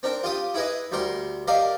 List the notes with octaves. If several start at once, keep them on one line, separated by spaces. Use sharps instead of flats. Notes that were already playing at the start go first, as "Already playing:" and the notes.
C4 D4 A#4
F4 G4 D#6
E4 G#4 B4 D#5
D2 G3 A#4 C6
G4 A#4 D5 D#5 F5